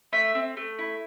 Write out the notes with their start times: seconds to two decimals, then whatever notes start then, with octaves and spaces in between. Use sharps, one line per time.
0.13 A3 E5
0.35 C4
0.57 A3
0.79 E4